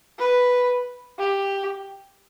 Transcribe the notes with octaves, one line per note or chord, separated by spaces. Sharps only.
B4
G4